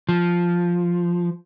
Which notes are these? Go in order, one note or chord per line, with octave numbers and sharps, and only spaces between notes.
F3